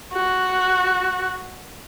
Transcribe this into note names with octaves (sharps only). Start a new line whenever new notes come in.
F#4